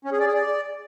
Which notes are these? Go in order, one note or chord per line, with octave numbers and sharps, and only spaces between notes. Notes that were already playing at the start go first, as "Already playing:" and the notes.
C#4
G#4
D5
G#4
D5